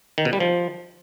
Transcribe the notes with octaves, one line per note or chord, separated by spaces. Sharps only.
D#3
B2
G3
F3